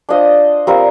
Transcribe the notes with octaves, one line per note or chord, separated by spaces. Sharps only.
D4 F4 C5 D#5
G3 C4 F4 A#4